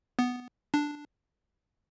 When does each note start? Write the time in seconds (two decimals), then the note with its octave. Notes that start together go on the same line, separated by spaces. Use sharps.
0.19 B3
0.74 D4